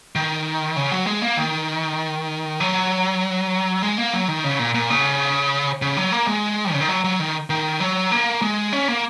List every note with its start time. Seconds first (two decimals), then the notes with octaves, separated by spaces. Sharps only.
0.16 D#3
0.76 C#3
0.92 F#3
1.07 G#3
1.22 A#3
1.37 D#3
2.60 F#3
3.82 G#3
3.98 A#3
4.13 F#3
4.28 D#3
4.44 C#3
4.59 A#2
4.74 A#2
4.90 C#3
5.82 C#3
5.97 F#3
6.12 A#3
6.27 G#3
6.73 C#3
6.81 D#3
6.88 F#3
7.04 F#3
7.20 D#3
7.50 D#3
7.80 F#3
8.12 A#3
8.42 G#3
8.73 C#4
8.88 A#3